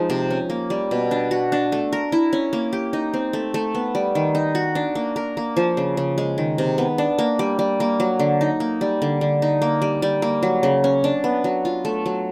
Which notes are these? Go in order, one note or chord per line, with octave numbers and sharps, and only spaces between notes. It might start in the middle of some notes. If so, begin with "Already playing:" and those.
Already playing: F3 G#3 D#4
C3
C#4
A#3
G3
B2
D4
F#4
D4
A3
A#4
E4
C#4
A#3
G4
D#4
C4
A3
A3
B3
G3
D#3
D#4
F#4
D4
A#3
A#4
A#3
F3
C#3
C#3
G#3
D#3
C3
B3
D4
A#3
G3
G3
A#3
F#3
D3
D#4
A#3
G3
D3
D3
D#4
A#3
G3
G3
A#3
F#3
C#3
C#4
D4
B3
F#3
F4
A3
F#3